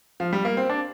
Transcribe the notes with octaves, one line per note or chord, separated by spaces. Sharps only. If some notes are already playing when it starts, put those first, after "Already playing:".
F3
G3
A#3
C4
D4